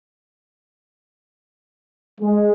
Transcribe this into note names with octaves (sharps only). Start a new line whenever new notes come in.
G#3